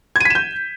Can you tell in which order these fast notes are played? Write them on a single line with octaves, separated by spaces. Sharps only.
G#6 D#7 B6 E7 G6